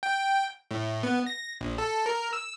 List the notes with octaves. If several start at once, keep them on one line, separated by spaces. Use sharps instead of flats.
G5
A2
B3
A#6
A#1
A4
A#4
E6